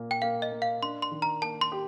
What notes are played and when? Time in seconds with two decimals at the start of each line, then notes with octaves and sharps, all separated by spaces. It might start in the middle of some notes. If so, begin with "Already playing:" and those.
Already playing: A#2 A#3
0.11 G5
0.22 A#3 F5
0.42 D#5
0.52 A#3
0.62 F5
0.82 D4 C6
1.02 C6
1.11 D#3
1.22 A#5
1.42 A#3 A5
1.61 C6
1.72 G4